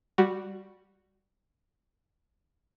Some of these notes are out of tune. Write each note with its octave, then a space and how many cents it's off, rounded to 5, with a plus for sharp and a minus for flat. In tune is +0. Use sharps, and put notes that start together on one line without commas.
G3 +0 F#4 +0